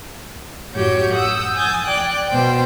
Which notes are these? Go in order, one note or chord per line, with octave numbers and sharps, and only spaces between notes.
F#2 A2 F#4 G4 C#5 G6
F#5 D#6 E6 G6
G#5 D#6 G6 A6
D5 G5 F#6
B2 C5 G5